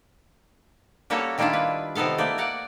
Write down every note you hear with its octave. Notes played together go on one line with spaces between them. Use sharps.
G3 A#3 C#4 F#4 A4 C#5
D#3 G3 A#3 D4 E4 F4
B4
C3 D#3 B3 A4 F5
A3 A#3 D5
A#4 D5 F#5